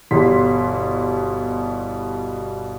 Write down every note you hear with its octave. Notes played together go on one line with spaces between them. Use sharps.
G1 B2 E3 G3 C6 B6